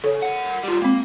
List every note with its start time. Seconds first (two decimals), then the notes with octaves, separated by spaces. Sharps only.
0.04 C#3 A4 C#5
0.22 A#4 F#5
0.63 G3 F4
0.82 G#3 A#3 C4